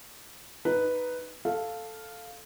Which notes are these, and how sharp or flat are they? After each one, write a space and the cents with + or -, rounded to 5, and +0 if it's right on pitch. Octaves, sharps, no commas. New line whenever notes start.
D#4 +0 B4 +0
A4 +0 F5 +0